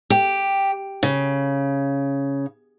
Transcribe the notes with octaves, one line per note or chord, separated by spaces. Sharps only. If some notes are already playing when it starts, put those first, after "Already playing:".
G4
C#3